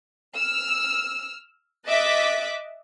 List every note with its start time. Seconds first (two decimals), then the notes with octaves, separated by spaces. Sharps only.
0.35 E6 F6
1.87 D#5 E5 D6 F#6 A6 B6